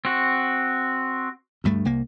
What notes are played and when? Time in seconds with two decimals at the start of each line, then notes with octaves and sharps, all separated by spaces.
0.05 C4 F#4
1.64 D2 G2 A3
1.85 C2 A#3